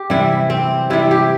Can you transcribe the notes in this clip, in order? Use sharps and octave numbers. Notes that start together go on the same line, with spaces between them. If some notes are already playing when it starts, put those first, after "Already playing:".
Already playing: G4
C3 E3 G3 E4
C4
C3 E3 G3 E4
G4